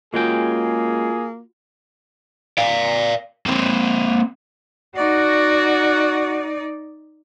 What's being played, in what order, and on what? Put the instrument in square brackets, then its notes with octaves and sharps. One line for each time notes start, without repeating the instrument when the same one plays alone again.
[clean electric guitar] G#3 C#4 G5 [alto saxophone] A#3 [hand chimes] F4 F#4 [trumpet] G#4
[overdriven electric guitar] D5 F5
A#3 C4
[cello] D#4 D5 [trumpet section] F#4